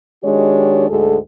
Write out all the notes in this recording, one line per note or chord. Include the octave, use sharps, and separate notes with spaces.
D#3 G#3 D4 F#4 G4 C#5
D2 G#2 G#3 F#4 G#4 A4